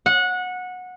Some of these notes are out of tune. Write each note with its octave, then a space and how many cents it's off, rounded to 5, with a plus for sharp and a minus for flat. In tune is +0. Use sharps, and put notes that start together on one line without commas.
F#5 -20